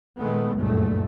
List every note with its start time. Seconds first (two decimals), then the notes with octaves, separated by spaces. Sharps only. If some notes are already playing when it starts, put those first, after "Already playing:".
0.19 A#2 D#3 G#3 A3 B3
0.56 F#1 C#2 G2 A#2 A3